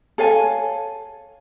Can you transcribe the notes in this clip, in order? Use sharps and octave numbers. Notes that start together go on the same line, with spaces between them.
A4 C#5 F5 G#5